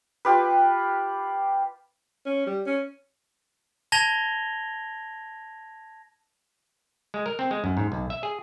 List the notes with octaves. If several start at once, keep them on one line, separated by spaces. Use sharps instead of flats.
F4 G4 B4
C#4
G3
C#4
A5 G#6 A#6 F7 G7
G#3
A#4
C4
G#3
F#2
G#2
B1
E5
G#4